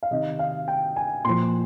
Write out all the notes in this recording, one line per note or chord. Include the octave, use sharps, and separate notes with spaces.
F5
C3 D#3 D#5
F5
G5
G#5
A#2 F3 C6